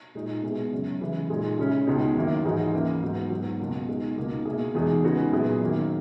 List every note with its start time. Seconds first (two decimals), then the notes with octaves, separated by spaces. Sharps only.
0.15 A#2 G#3 D#4
0.43 B2 G#3 B3 E4 G#4
0.72 F#2 C#3 F#3
1.01 C#3 E3 G#3
1.29 A#2 G#3 D#4 G#4
1.58 C#3 G#3 C#4 E4
1.87 C#2 B2 G#3 D#4
2.15 F#2 D#3 A#3 E4
2.45 G#2 E3 G#3 D#4 F#4
2.73 C#2 C#3 E3 A#3 E4
3.02 G#2 F#3 B3 F#4
3.30 G#2 F#3 B3 F#4
3.59 C#2 B2 A#3
3.88 B2 G#3 D#4
4.17 C#2 B2 A#3 D#4
4.45 B2 A#3 E4 G#4
4.75 E2 B2 G#3 D#4 G#4
5.04 C#3 G#3 B3 D#4 F#4
5.32 A#2 F#3 B3 E4 G#4
5.60 F#2 D#3 A#3